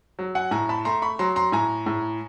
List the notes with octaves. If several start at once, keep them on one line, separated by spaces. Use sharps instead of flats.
F#3
F#5 G#5
A2 G#5 A#5
A5 B5
A3 A#5 C6
B5 C#6
F#3 A#5 C6
A#5 C6
A2 G#5 A#5
A2